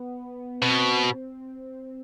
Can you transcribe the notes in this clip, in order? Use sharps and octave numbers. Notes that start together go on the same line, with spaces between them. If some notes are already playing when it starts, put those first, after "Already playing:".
Already playing: B3
B2 C4